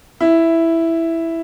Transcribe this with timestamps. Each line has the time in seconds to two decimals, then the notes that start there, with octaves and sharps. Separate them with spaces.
0.21 E4